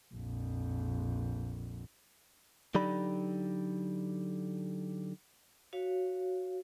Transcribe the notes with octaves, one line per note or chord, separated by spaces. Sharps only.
A#1 F2
D3 F#3 D#4 G4 D5 B5
F#4 C#5 F5